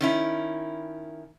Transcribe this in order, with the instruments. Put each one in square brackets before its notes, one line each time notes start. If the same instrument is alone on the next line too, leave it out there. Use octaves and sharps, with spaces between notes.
[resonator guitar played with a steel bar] D#3 C#4 E4